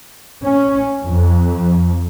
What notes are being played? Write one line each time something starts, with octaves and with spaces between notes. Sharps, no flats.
C#4
F2